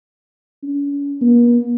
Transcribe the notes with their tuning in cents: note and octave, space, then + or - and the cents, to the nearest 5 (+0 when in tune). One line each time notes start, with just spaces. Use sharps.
C#4 +40
A#3 +45